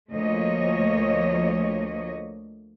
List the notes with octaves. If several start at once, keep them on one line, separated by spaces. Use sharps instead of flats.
D2 F3 A3 A#3 C#5 D#5